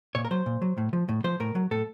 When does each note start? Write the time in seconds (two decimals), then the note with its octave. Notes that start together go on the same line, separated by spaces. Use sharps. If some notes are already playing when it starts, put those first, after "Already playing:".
0.15 A#2 C#5
0.25 A#4
0.31 F#3 C5
0.46 A#2
0.62 F#3
0.78 A2
0.93 F3
1.09 A2
1.24 F3 C5
1.40 A2 A#4
1.55 F#3
1.71 A2 A4